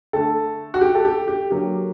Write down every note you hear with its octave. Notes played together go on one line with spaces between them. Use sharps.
D3 A3 A4
F#4
G4
A4
G4
G4
D3 F#3 A#3 G4